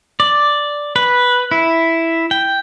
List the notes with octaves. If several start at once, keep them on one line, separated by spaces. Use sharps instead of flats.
D5
B4
E4
G5